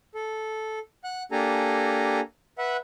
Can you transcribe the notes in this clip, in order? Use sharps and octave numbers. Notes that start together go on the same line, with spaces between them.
A4
F#5 F#6
A#3 D4 G4 A4 G#5 A#5
B4 E5 F#5